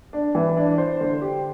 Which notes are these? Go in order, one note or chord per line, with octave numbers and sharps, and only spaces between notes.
D4
E3
D4
C5
D3
G4